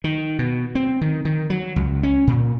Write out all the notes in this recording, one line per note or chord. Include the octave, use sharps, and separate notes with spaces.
D#3
B2
C4
D#3
D#3
F#3
C#2
C#4
A#2